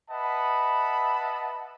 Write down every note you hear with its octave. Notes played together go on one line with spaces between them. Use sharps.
B4 D#5 E5 F#5 A5 B5